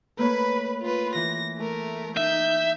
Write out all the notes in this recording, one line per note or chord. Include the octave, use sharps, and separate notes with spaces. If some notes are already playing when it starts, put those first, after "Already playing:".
A3 A#3 B4 C#5 B5
F4 B4
E3 A#6
A3 A#4
D#4 E5 G6